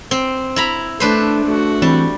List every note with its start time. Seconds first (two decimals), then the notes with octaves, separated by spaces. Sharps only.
0.11 C4
0.56 E4 A#5 B5
1.00 A3 D4 B4 C5
1.45 A3 F#4
1.82 E3 G3 C4